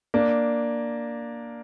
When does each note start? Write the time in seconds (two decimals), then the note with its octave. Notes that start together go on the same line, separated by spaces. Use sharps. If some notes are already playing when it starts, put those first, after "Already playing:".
0.14 A#3 D4